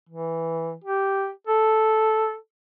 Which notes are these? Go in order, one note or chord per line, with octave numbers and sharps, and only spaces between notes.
E3
G4
A4